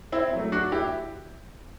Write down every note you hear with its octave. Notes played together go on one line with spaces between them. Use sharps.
C4 E4
F#3 A3
D4 F#4
E4 G4